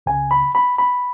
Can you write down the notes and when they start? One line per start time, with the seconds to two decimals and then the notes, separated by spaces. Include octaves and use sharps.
0.06 C#2 C#3 G#5
0.31 B5
0.55 B5
0.78 B5